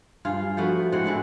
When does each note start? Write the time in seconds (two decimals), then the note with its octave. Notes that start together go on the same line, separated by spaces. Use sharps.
0.25 G2 F4 G#4 F5
0.57 F3 A3 B3 F#4
0.92 A2 G#3 C4 F#5
1.04 A3 C4 D4 E4